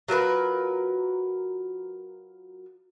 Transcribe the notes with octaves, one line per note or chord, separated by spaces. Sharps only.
F#3 F4 A#4 B4